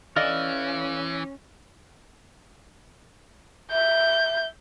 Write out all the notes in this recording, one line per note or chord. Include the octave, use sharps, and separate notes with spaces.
E3 C#4 A4 D5 D#5 F5
E5 G6